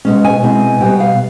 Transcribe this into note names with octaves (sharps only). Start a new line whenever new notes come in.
B2 G#3 C#4
G#5
B2 G#3 C4 E4
B2 G3 B3 G5
F5